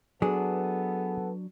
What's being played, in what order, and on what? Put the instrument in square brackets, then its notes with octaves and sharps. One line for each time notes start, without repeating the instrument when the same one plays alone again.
[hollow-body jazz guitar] F#3 D4 [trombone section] B3 A4 [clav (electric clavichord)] G#4